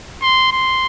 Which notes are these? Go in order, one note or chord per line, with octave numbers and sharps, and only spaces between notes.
C6
C6